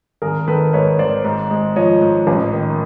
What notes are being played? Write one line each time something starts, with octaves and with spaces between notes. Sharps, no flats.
G#1 G#4 A#4
D#3 A4 B4
G#2 B4 C#5
G#1 C5 D5
G#2
G#3
F3 C#5 D#5
G#2
A1
D#3